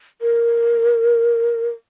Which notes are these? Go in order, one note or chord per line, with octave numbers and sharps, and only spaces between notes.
A#4